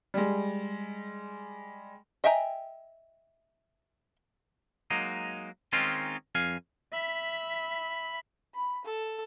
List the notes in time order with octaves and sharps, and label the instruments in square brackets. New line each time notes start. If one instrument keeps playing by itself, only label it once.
[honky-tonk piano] G3 G#3
[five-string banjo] D#5 E5 G5 G#5 A#5
[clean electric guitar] F#3 G#3 A#3 D#4
D#3 G#3 C4 C#4 D#4 F4
F2 F5 G#5
[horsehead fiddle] E5 [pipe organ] B5
[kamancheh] B5
A4